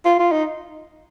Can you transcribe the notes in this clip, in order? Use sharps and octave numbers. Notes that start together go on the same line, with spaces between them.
F4
F4
D#4